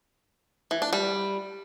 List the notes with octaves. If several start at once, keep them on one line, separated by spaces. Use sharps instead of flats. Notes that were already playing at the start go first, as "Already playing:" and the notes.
E3
D4
G3